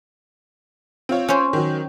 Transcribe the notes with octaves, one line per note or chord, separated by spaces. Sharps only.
C4 F4 C#5
C#4 C5
D#3 F#3